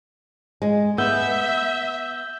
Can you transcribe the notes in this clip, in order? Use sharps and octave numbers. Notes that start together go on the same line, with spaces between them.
G#3
B3 E5 E6 G6 G7